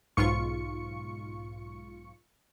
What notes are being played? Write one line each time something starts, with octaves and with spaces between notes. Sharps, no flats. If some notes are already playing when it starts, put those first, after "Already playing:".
B1 G#2 F4 C#6 C#7